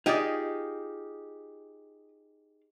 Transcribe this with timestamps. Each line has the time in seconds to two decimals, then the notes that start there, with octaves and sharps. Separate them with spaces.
0.06 D#4 F4 G4 G#4 D5 D#5